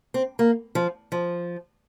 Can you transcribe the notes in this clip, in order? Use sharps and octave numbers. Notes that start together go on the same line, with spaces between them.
C4
A#3
F3
F3